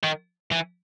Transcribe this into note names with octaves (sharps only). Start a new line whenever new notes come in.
D#3
E3